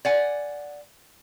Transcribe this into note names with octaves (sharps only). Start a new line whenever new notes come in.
D5 F#5 G#5